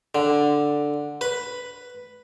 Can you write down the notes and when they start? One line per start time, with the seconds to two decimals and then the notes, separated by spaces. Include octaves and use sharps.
0.15 D3
1.21 B4